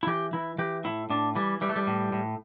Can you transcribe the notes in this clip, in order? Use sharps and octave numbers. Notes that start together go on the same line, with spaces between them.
E4
E3 G4
E3 E4
E3 G4
A2 E4
A2 D4
E3 G3
E3 G3
A3
G3
A2
A2